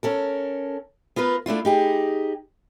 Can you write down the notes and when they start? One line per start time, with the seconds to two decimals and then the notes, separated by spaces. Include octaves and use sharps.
0.03 C#4 A4 A#4
1.16 B3 F4 A#4 B4
1.46 A3 D4 E4 F4
1.65 D#4 G4 G#4